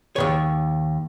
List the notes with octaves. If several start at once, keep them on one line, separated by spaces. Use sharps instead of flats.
D#2 C3 C#5